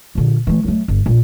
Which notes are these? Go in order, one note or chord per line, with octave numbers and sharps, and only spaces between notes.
A#2 D3
E3 A3
F#3 A3
G1
F1 A#1